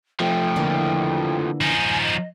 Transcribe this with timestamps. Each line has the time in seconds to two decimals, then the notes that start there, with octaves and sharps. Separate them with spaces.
0.20 F3 A3 G5
0.56 D3 E3 A#3
1.61 F3 D#4 G#5
2.02 D#5